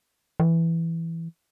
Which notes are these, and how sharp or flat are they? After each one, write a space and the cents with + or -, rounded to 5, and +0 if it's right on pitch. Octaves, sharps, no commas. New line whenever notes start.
E3 +5